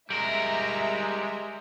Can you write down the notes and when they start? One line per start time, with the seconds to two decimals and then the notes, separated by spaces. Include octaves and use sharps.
0.10 G3 G#3 A#4 E5 A#5